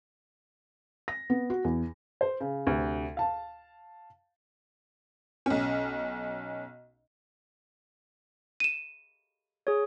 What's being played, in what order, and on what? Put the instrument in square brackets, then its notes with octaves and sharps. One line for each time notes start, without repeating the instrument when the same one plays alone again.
[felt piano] A#6
B3
F#4
E2
[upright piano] C5
C#3
D2 C3
F5 A5
[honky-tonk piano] B1 C#4
[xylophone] D#7 E7
[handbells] G#4 C#5